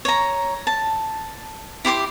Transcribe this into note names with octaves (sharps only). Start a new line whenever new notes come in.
C#5 A#5
A5
E4 G4 C6 D6